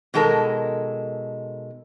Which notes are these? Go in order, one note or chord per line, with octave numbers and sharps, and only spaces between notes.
B2 D#3 G#3 A4 A#4